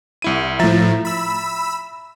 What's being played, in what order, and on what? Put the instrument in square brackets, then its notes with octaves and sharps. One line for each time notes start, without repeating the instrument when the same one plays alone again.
[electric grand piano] C2 E4 D#7
[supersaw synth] A2 F3 [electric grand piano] E5 A#5 A6
[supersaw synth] B5 E6